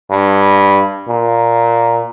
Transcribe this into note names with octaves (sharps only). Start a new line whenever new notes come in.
G2
A#2